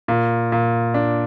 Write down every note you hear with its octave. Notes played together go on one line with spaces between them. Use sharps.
A#2
A#2
D4